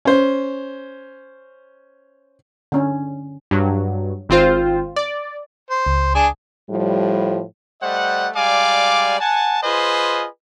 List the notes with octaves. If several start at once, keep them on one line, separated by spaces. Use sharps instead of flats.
C#4 C5
D3 C#4
G2 F#3
G#1 C4 F4 C5
D5
C5
C#2
D4 G#4 G#5
A2 F3 G3
G3 A3 C5 D#5 F#5
G3 G#3 D5 F5 G#5 D6
F#5 G#5 A5
F4 G#4 B4 C5 D#5 G#5